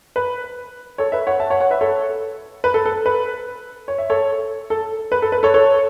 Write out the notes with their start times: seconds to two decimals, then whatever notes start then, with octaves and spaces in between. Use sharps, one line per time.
0.16 B4
0.98 A4 C#5
1.12 B4 E5
1.27 C#5 F#5
1.40 E5 A5
1.50 C#5 F#5
1.60 C#5 F#5
1.71 B4 E5
1.81 A4 C#5
2.64 B4
2.74 A4
2.85 A4
3.06 B4
3.88 C#5
3.98 E5
4.10 A4 C#5
4.70 A4
5.12 B4
5.22 A4
5.32 B4
5.43 A4 C#5
5.54 A4 C#5